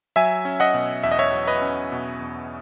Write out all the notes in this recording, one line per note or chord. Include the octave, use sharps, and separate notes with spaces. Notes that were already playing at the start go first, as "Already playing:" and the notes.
F#3 E5 G#5
C#4
D#5 F#5
B2
E2 E5
D#5
C#5 E5
F#3
B4 D#5
C#4
B2
E2